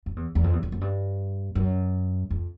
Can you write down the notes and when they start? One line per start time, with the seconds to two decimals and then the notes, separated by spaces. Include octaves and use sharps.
0.06 F2
0.16 E2
0.35 E2
0.44 F2
0.53 E2
0.63 F2
0.72 F#2
0.81 G2
1.55 F#2
2.30 F2